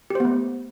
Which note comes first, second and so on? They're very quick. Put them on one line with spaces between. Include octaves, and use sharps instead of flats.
G4 C5 B3 A3